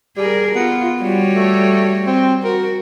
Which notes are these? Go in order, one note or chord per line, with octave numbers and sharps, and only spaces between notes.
G3 G#4 A#4
B3 F4
G3 F#4 C#5
A3
C4
F#4 A#4